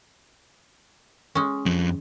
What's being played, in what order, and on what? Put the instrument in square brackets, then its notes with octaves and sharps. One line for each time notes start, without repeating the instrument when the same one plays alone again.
[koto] G#3 C#4
[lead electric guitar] F2